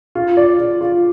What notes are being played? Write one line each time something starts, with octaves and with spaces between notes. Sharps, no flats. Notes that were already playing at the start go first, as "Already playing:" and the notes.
F4
D5
F4
F4